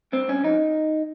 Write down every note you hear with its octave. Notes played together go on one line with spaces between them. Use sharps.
G2 C4
G2 C#4
F2 D#4